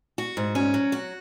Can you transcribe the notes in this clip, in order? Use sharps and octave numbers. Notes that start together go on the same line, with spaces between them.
F#4
G#2
C#4
F#3
F#4